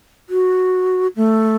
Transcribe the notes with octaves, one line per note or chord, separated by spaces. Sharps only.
F#4
A3